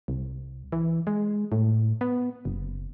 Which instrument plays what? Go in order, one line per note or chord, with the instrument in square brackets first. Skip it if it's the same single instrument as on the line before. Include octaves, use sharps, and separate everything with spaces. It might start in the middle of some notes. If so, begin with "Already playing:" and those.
[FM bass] C2
E3
G#3
A2
B3
F#1